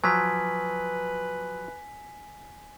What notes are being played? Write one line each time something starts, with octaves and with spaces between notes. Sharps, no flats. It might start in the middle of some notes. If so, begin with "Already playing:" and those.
F3 F#3 B4 G#5 B6